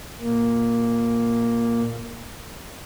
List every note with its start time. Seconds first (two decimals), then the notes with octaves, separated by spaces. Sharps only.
0.21 A#2 A#3